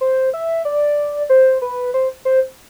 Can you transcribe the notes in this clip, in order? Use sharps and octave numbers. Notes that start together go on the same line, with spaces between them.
C5
E5
D5
C5
B4
C5
C5